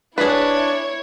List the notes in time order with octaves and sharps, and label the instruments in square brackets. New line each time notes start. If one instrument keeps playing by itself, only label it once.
[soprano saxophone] D4 [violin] E4 C#5 [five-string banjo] G#4 B4